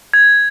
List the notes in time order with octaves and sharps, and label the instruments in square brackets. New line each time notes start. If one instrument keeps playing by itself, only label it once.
[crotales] G#6